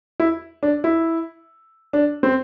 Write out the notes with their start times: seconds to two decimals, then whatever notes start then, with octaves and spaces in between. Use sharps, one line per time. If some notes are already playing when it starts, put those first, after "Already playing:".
0.20 E4
0.63 D4
0.84 E4
1.93 D4
2.23 C4